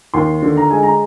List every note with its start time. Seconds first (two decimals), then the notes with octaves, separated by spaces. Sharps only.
0.14 D#2 C6
0.42 D3
0.57 A#5
0.70 G#3 G#5
0.83 A#5